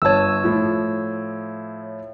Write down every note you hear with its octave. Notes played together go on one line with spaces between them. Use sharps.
G1 C#5 A5 E6
A2 F3